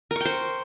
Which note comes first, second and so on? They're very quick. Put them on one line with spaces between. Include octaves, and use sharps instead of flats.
A#4 C#6 G5 C5